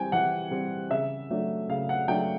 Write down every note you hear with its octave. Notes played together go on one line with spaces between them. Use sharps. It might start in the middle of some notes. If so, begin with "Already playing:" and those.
Already playing: E3 G3 C4 G5 G#5
E3 F#5
G3 C4
C#3 E5
F#3 A3 D4
C#3 F5
F#5
F#3 A3 D4 G5